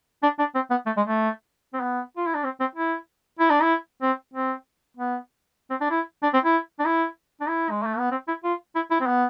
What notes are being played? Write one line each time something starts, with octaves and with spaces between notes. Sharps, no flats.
D4
D4
C4
B3
A3
G#3
A3
C4
B3
F4
E4
D4
C4
C4
E4
E4
D4
E4
C4
C4
B3
C4
D4
E4
D4
C4
E4
D4
E4
D4
E4
G#3
A3
B3
C4
E4
F4
E4
E4
C4
B3